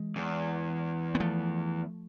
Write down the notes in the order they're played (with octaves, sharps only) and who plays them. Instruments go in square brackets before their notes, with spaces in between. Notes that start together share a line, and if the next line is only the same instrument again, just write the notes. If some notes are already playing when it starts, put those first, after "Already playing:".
Already playing: [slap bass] E3 G#3
[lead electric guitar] E2
[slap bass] B3
F3 A3